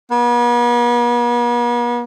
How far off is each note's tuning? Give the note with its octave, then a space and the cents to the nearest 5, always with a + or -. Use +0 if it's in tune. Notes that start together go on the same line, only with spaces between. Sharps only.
B3 -45